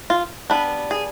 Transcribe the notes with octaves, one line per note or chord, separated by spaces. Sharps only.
F4
G3 B3 D4 B4
G#4